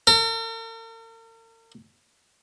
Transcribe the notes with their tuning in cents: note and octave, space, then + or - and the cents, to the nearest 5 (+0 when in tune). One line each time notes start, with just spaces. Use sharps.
A#4 -45